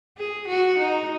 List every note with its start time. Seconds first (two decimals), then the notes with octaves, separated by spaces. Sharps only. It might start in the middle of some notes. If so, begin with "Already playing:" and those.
0.17 G#4
0.48 F#4
0.78 D#4